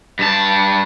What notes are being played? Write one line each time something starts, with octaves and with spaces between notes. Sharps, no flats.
G2 A5